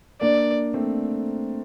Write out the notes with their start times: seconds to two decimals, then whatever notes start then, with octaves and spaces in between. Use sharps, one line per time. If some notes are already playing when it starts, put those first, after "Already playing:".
0.21 A#3 D4 D5
0.74 A3 C4